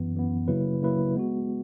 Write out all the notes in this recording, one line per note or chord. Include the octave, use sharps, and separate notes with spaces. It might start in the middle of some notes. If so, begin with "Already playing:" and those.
Already playing: F#2 E3 B3
F#2 E3 B3
C#3 F#3 A#3 E4 B4
C#3 F#3 A#3 E4 B4
G#3 B3 F#4